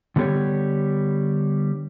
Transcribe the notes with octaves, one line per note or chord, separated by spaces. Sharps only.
D3 G3 B3 G4 C#5